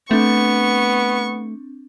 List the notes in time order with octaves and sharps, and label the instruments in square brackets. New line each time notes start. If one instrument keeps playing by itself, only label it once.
[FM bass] A3 [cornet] B3 [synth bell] C4 D4 [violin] C#6